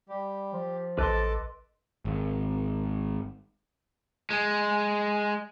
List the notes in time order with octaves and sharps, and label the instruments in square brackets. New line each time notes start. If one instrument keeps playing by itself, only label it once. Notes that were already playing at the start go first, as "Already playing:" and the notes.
[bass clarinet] G3 [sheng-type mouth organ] G4
[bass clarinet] F3
[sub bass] A1 [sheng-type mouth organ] A4 A5 D6 [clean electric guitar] B4 D#5 C6
[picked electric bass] G#1
[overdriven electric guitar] G#3